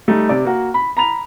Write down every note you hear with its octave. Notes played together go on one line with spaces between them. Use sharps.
G3 A3 D#4
C3 D5
A#3 F#4
B5
A#5 B5 F7